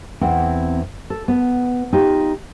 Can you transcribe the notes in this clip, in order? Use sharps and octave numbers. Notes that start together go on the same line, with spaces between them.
E2 C4 E4 F#5
A4
B3
D#4 F4 G4